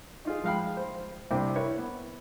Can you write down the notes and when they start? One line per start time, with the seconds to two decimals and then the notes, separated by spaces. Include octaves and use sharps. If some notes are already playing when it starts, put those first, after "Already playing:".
0.25 D#4 F4 G#4
0.43 F3 G#3 F5 G5 B5
0.77 C5
1.31 C2 C3 D4 C5 G5
1.55 E4 A#4 B4 C#5
1.77 B3